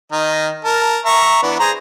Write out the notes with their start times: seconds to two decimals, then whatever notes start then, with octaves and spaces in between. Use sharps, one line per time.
0.12 D#3 D#5 A#5
0.65 A#4 A5
1.05 E5 A#5 C#6
1.43 E3 B3 D4
1.59 G#4 C5 A#5